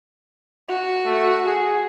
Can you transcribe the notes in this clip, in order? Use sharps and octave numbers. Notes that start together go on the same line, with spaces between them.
F#4
A3
G#4